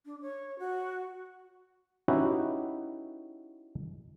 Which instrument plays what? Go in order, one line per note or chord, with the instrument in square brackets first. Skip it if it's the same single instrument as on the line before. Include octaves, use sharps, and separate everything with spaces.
[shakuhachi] D4
C#5
F#4
[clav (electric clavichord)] C#4 D#4 E4 F#4 G4 B4